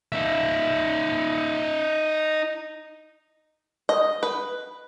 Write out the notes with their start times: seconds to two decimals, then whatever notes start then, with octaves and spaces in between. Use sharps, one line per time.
0.12 D#4 E5
3.89 D#5
4.23 B4